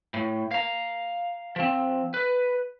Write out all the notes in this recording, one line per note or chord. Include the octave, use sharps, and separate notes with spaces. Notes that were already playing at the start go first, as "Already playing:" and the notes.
A2
F5 A#5
F3 C4
B4